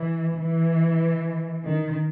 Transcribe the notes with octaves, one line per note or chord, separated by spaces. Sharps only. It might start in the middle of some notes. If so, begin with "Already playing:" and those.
Already playing: E3
E3
D#3